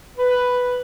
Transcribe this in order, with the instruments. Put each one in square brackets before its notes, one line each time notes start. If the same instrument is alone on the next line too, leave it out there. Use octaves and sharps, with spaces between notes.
[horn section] B4